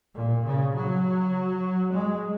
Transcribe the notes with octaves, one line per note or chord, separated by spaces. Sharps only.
A#2
C#3
F#3
G#3